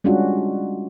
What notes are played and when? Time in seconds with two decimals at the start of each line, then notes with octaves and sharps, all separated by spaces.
0.04 G3 G#3 C#4 D4 F4 F#4